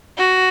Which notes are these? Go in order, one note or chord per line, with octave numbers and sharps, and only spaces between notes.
F#4